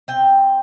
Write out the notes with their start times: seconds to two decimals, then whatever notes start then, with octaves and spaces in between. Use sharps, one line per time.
0.08 C4 G5